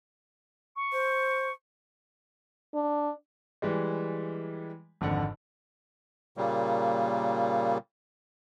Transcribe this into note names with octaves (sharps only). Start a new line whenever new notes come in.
C#6
C5
D4
E3 G3 G#3
G#1 F2 D3 F#5
A#2 C#3 G3 A#3